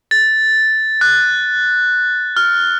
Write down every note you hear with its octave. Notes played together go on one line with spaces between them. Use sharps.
A6
F#6
F6